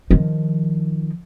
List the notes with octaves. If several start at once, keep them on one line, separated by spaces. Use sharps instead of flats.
D#3 F3